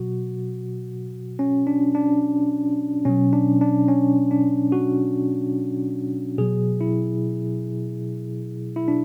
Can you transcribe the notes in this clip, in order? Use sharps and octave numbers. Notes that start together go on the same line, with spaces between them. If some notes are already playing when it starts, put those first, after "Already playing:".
Already playing: B2 F#3 F#4
C#4
D4
D4
B2 F#3 C#4
D4
D4
C#4
D4
F#4
B2 F#3 G#4
E4
E4
D4